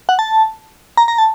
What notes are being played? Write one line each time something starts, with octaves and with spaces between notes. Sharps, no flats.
F#5
A5
A#5
A#5
A5